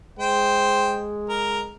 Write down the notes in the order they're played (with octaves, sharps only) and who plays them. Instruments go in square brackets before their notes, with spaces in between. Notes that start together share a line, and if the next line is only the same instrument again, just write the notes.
[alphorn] G#3 [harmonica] C5 G5
[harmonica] A#4